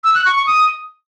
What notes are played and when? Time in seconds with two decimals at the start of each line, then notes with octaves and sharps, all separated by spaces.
0.04 E6
0.15 F#6
0.25 C#6
0.36 C#6
0.47 D#6